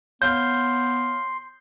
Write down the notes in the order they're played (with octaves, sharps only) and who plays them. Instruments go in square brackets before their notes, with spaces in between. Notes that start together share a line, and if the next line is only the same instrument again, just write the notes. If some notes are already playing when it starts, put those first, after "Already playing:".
[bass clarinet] B3 [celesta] C#5 F5 F6 [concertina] C6 [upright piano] G6